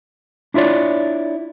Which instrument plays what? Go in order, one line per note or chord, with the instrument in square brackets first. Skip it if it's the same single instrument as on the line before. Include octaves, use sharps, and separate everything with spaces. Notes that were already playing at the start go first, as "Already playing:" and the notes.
[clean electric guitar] D4 E4 F4 C#5 D5